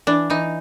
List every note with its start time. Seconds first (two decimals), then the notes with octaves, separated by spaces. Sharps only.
0.07 E3 D4
0.30 E3 D#4